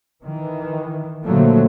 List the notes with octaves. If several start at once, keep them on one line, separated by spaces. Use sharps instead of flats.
D#3 E3
A#2 D3 F3 F#3 A3 A#3